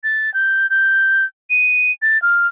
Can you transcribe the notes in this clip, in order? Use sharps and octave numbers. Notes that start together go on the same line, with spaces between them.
A6
G6
G6
D#7
A6
F6